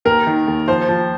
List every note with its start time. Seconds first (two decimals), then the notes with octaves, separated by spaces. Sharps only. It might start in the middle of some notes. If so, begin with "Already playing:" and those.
0.05 D#2 A#4
0.27 D#3
0.47 D#2
0.68 F3 C5
0.89 F3